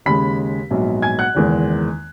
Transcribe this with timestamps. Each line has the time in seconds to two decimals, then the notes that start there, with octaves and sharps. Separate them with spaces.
0.06 D#2 C#3 G#3 B5 B6
0.71 A#1 G#2 F#3 B3
1.02 G#5 G#6
1.19 F#5 F#6
1.35 F#1 E2 D#3 G#3